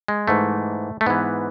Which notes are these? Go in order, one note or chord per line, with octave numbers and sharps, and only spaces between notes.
G#3
G#2 E3 A3
A3
G#2 E3 B3